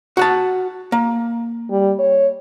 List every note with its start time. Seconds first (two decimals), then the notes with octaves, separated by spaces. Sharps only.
0.17 F#4 F#5 A5
0.92 A#3
1.70 G3
1.99 C#5